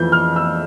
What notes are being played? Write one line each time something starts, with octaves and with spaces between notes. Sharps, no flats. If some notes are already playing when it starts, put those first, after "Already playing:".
Already playing: F2 E3 G6
F6
E6